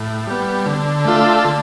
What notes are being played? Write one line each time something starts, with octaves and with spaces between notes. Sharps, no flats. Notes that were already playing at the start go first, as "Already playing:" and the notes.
Already playing: A2
G3 B3
D3
A3 D4 F4 A4
D3